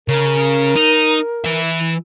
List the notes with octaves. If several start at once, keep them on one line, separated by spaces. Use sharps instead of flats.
C#3 A#4
D#4
E3 E5